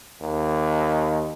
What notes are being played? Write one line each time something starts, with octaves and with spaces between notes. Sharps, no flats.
D#2